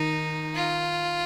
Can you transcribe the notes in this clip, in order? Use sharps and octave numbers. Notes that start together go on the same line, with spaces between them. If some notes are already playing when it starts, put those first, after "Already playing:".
Already playing: D#3 D#4
F4